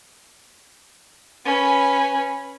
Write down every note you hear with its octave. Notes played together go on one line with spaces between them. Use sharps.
C#4 B4